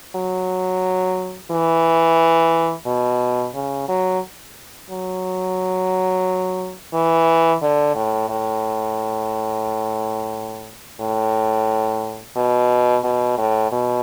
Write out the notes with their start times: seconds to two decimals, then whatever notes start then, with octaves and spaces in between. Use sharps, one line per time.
0.16 F#3
1.51 E3
2.86 B2
3.54 C#3
3.89 F#3
4.91 F#3
6.93 E3
7.62 D3
7.95 A2
8.30 A2
11.00 A2
12.36 B2
13.04 B2
13.38 A2
13.72 B2